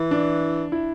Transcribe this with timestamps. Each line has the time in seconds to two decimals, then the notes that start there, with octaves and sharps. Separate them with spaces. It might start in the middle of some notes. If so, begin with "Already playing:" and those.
Already playing: E3 E4
0.11 D4
0.72 E4